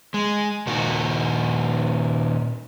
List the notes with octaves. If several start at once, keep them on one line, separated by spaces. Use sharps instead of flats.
G#3
A#2 D#3 F#4